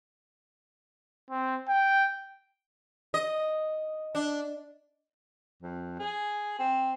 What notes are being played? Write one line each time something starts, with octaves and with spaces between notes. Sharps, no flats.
C4
G5
D#5
D4
F2
G#4
C4